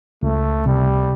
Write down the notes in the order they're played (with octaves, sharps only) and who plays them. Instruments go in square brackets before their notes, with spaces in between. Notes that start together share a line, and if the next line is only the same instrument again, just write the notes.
[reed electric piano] C#2 [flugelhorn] A3
[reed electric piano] C3 [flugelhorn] G3